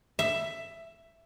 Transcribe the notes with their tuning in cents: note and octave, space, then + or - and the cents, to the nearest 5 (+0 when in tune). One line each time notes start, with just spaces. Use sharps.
E5 +10